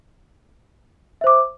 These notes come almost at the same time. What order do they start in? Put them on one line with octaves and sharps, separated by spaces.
E5 C5 D6